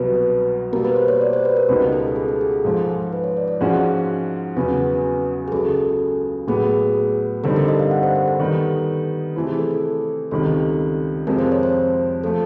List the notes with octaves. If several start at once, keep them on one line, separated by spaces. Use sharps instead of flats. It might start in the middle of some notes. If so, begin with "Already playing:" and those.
Already playing: C2 B2 F#3 B4
B2 G3 A#3 A#4
B4
C5
C#5
D5
C5
B4
A#4
C#2 B2 G3 B3 D#4 A#4
A4
G#4
A4
G#4
A4
G#2 F3 G#3
B4
C#5
D5
D5
G#2 F3 G#3 C#4 F#4
E2 C#3 F#3 B3 B4
G#4
C#2 C#3 F#3 A4
A2 F#3 B3 G#4
G2 D3 G3 C4 D#4 A4
A#4
D#5
F5
F#5
C5
A#4
A4
D#3 G3 B3 D#4
C3 E3 A3 C4 E4 A4
G#4
A4
A4
C#2 C3 D#3 G3 A4
F2 C3 F3 G#3 A#4
C5
C#5
C5
F3 A3 A4